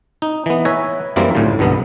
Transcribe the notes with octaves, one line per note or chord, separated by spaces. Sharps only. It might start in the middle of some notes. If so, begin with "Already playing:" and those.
D#4
E3 B3
B4 C#5 E5 G#5 A#5
F#2 E3 G3 A#3 C4
C#2 A2 D3
B1 G2 D3 B3